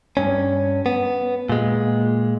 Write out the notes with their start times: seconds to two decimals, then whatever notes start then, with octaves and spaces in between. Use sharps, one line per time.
0.17 G2 C#4
0.86 B3
1.49 A#2 G#3